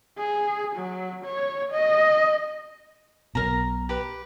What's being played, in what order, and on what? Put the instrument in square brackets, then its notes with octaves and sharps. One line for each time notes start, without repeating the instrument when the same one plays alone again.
[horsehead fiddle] G#4
F#3
C#5
D#5
[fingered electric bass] B1 B2 [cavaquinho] A#4 A#5
[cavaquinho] G4 B4